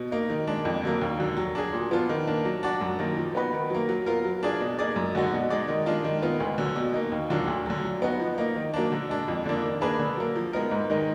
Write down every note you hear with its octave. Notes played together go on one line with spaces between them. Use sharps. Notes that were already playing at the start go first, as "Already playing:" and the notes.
Already playing: B2
A#3 D#4
D#3
G#3 D4
F2
D3 F#3 A#3
D#2
D3 F#3
F#3
D4 G#4
A#2
F3 B3 D4 F4
D#3
A#3 D4
F#3
D4 F#4 D5
F#2
D#3 F#3 A#3
F3
B3 D#4 F#4 B4
D#3
F#3 A#3
F#3
B3 F4 A#4
F#3
D4 F4 G#4 D5
B2
A#3 D#4 G#4 D5
F#2
D3 G#3 D#4 F#4
B2
G#3 D#4 G#4 D5
D#3
G#3 D4 F4
D#3
G#3 B3 F4
D2
D3 F#3
B2
A#3 D#4
D#2
D3 F#3 D4 F4
D2
D3 F#3
F#3
B3 D#4 F#4
F3
A#3 D#4
D#3
F#3 A#3 D4
D3
G#3 D4
F2
D3 F3 A#3 D4
D#3
A#3 D4 G#4 B4
D3
F#3 A#3
F3
G#3 B3 D#4 A#4
G#2
D#3 G#3 D#4